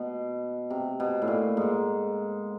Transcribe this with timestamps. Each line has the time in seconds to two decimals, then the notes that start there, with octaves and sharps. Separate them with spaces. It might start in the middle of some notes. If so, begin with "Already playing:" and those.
Already playing: B2
0.70 C3
1.00 B2
1.22 A2
1.28 A#2
1.57 G#2